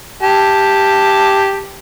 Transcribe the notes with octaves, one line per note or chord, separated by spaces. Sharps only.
G4 A5